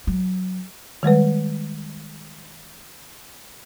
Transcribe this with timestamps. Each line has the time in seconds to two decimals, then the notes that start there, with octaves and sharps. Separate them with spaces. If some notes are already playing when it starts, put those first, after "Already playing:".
0.07 F#3
1.03 D#3 G3 G#3 B4